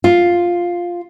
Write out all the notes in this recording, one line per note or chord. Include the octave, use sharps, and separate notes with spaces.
F4